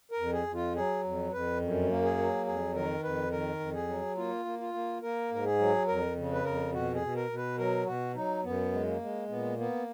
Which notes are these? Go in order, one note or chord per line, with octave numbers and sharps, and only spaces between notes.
A#4
F2
G#4
F2
F4
F#3 G#4
F2
F2 B4
F#2
A#3
G#4
F#3
F2 G#4
D#3 A#4
F2 B4
D#3 A#4
F2
G#4
F#3
A#3 F4
A#3
F4
A#3
A#3 A#4
G#2 A#4
G#4
F#3
F2 A#4
C#3
B4
F2 A#4
B2 F#4
G#4
B2
A#4
B2
B4
F#3 A#4
B2 F#4
F#3 D#4
F#2 B3
G#3
A#3
G#3
A#2 B3
A#3 B3